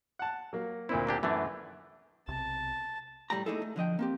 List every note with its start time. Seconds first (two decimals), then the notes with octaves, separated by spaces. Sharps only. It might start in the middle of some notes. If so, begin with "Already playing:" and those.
0.19 F#5 A5
0.53 F#3 A#3
0.89 D2 A#2 C4 E4
1.07 A#3 D4 G4
1.23 F#2 E3 A3 D4
2.28 B1 C3 A5
3.30 A2 G3 A3 G5 A#5
3.46 A3 A#3 D#4 E4 G#4 A4
3.62 A3
3.76 D3 F3 D#5 G5
3.99 A#3 C4 G4